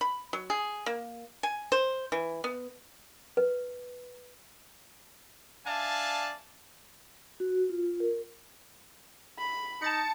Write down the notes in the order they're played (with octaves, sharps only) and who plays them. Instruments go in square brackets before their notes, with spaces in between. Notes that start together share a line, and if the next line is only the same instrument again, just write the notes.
[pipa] B5
F#3
G#4
A#3
G#5
C5
E3
B3
[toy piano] B4
[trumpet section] D4 D5 E5 F5 G#5 A5
[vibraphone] F#4
F4
A#4
[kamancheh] B5
[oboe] D#4 [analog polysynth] A5 A6 C#7